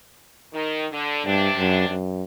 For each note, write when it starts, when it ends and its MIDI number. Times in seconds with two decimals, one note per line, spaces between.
0.53 0.84 51
0.91 1.24 50
1.26 1.49 43
1.26 1.92 48
1.26 1.92 62
1.58 1.87 42
1.89 2.23 42